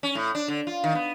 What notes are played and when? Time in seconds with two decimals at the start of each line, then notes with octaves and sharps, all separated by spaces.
0.03 C#4
0.15 A2
0.35 D4
0.48 D3
0.67 F4
0.84 D#3
0.95 B3